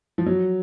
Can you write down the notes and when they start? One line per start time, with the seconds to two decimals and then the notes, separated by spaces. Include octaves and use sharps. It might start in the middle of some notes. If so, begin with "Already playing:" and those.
0.18 F3
0.26 F#3